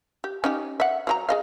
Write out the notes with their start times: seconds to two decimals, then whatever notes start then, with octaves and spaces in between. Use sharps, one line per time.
0.24 G4
0.44 C#4 D#4 G4
0.80 E5 F#5
1.07 F#3 F4 A#5
1.29 G#4 D#5 F5